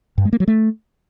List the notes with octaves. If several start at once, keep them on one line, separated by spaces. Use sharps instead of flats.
G2
G#3
A#3
F#3
A3